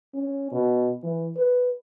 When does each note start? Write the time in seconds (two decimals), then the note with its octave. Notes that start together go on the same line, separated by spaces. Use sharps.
0.14 C#4
0.52 B2
1.03 E3
1.36 B4